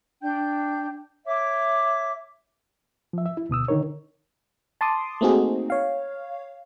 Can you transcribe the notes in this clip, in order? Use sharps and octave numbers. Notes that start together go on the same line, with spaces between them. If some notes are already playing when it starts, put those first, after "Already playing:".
D4 G5 G6
C#5 E5 D6
F3 E5
E5
E4
D2 B2 D#6 E6
D3 D#3 D#4 A#4 C#5
A5 C6 D6 D#6
A3 A#3 C4 D#4 F#4 G#4
C#5 F5